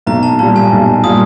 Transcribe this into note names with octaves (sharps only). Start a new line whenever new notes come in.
B1 A#5
A5
A#2 G3 A5
G#5
B1
A#2 G3 D#6